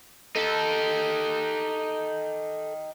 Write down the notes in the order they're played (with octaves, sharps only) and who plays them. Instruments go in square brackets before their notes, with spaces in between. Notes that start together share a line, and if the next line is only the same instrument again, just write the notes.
[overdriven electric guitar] D#4 G4 [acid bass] A4